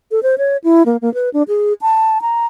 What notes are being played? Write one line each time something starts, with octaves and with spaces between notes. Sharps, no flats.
A4
C5
C#5
E4
A#3
A#3
B4
D4
G#4
A5
A#5